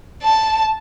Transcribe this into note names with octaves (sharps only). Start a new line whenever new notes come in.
A5